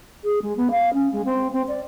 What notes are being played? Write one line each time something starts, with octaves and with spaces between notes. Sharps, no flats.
G#4
G#3
B3
F5
C#4
G#3
C4
C4
D5